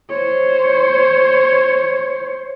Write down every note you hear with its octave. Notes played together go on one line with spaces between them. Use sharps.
C5 C#5